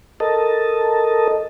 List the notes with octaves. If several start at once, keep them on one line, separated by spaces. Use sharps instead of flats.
A4 A#4 D#5 A5